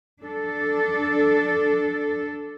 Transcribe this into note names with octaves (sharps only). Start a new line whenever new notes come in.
D4 A4